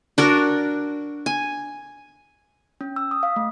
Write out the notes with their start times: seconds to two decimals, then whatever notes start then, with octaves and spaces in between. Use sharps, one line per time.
0.18 D4 F#4 A#4
1.26 G#5
2.81 C#4
2.96 E6
3.11 D#6
3.23 F5
3.36 A3